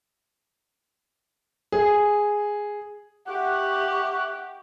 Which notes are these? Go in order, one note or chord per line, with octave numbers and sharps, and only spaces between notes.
G#4
G4 E5 F#5 C#6 D6